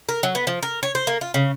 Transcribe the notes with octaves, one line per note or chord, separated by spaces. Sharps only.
A#4
F#3
B3
F3
A#4
C#5
C5
A#3
F4
C#3